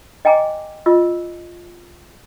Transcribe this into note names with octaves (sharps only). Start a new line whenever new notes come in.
D#5 G5 G#5 A#5 D6
F4 D#5 E6